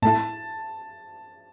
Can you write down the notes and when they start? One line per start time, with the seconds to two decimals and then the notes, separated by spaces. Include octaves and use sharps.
0.02 A2 A3 E4 A5